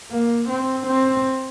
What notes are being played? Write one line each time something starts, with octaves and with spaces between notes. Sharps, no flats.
A#3
C4
C4